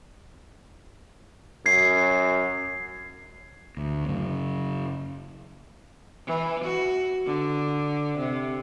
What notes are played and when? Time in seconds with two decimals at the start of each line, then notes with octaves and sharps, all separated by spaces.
1.66 F#2 G#6 C7
3.77 D2
4.08 F#2 C#3
6.26 E3
6.64 F#4
7.26 D3
8.17 C3